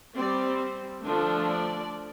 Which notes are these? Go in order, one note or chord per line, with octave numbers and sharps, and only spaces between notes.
G3 C4 D5
D3 F3 A3 D4
D5